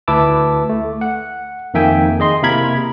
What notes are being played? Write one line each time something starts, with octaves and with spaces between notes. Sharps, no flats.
D2 E4 B4 A5 D6 E6
A3
F#5
F2 D#3 A#3 E5 G5 G#5
G#4 D#5 C6
C3 A#3 E4 A#4 B5 G#6